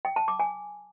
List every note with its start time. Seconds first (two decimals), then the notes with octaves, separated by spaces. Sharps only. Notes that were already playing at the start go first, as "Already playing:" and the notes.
0.05 G5
0.16 A5
0.28 D6
0.40 G#5